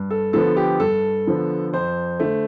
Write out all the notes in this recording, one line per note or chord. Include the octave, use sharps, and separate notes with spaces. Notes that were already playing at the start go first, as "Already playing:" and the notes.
Already playing: G2
A4
D3 F3 B3 A4
G4
G2 A4
D3 F3 B3
F2 C5
D3 A3